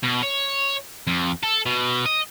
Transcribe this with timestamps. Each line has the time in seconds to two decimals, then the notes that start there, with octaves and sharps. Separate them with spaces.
0.04 B2
0.23 C#5
1.07 F2
1.43 A4
1.66 B2
2.06 D#5